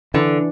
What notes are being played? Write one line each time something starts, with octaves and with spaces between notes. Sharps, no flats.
D3 E3